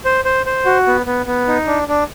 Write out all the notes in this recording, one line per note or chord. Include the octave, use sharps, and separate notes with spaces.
C5
C5
C5
F#4
B3
B3
B3
D#4
D4
D4